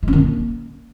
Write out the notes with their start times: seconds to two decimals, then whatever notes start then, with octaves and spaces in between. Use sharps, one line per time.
0.03 G#3
0.08 C#4
0.13 D#3
0.18 A#3